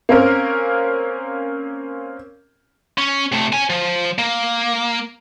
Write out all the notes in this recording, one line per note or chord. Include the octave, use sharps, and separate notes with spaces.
A#3 C4 C#4 A#4
C#4
C3 A3
C#5 G#5
F3
A#3